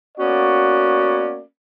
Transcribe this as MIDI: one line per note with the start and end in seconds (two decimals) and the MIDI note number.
0.18 1.41 58
0.18 1.41 59
0.18 1.41 61
0.18 1.41 66
0.18 1.41 74